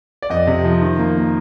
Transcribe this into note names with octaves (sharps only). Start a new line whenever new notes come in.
D5
F2 D#5
C3
F3
D#3
A#3
A#3